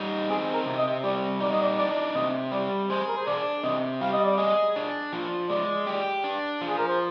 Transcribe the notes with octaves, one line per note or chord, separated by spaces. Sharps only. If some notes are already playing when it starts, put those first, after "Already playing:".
Already playing: G3 D#4
C4 G#4
A#4
C3
D#5
G3 D5
D#4 D5
D#5
D5
D4 D5
C3 D#5
G3 D5
G#4 C5
A#4
C5
D4 D5
C3 D#5
G3 F5
D#5
D5
G#4 D#5
D4
F3
G#3 D5
G4
D4
F3
G#4
A#4
C5